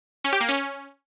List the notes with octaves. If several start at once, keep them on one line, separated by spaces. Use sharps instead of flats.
C#4
G4
A#3
C#4